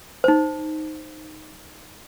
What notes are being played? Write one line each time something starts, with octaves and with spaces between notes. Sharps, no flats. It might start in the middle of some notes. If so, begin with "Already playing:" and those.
D#4 C5